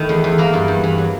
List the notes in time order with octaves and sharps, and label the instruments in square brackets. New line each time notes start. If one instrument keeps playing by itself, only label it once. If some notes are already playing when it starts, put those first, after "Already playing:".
Already playing: [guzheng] D#3 A3 E4
E2
E2
E3 A#3 A#4
G2
G2
E3
F#3